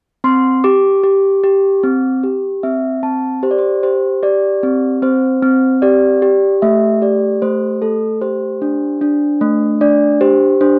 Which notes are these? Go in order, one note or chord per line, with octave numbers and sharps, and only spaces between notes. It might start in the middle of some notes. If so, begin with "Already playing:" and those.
C4 C6
G4 D6
G4
G4
C4
G4
C4 E5
C4 A5
G4 C5
D5
C5
G4 C5
G4 D5
C4
C4 C5
C4
G4 D5
G4
A3 E5
G4 D5
A3 C5
A3 A4
G4 C5
D4
D4
A3
D4 D5
G4 C5
D4 C5